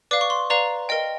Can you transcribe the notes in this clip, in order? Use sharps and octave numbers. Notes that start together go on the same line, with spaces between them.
B4 D5 F5 D6
C#6
C6
B4 D5 F5 A#5
A#4 D#5 G5